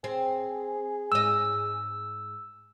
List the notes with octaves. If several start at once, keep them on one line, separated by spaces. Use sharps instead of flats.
C4 G#4
G#2 D#5 E6